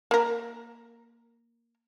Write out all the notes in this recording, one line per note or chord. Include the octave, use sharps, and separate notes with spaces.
A#3 A#4